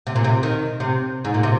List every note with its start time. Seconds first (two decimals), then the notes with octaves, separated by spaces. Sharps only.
0.07 C3
0.16 A#2
0.24 C3
0.43 D#3
0.80 C3
1.25 G#2
1.34 A#2
1.43 C3